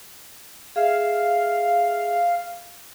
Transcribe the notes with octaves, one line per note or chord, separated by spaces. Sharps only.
G#4 E5 F5